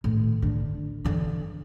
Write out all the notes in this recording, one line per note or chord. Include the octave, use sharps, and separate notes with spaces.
A2 D#3
D3
D3 E3